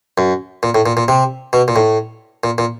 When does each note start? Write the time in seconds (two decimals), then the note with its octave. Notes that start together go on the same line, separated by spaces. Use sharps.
0.18 F#2
0.63 A#2
0.75 A2
0.86 A#2
0.97 A#2
1.08 C3
1.53 B2
1.68 A#2
1.76 A2
2.44 A#2
2.58 A#2